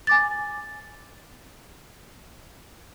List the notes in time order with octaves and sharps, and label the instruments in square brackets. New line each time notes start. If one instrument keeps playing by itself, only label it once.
[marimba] G#5 D6 A6